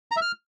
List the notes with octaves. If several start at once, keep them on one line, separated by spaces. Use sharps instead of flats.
A#5
E5
F6